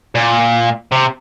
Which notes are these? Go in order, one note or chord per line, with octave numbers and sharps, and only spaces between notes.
A#2
C3